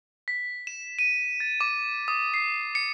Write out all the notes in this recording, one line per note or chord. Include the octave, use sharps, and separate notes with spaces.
B6
E7
D#7
A6
D6
D#6
C7
C#7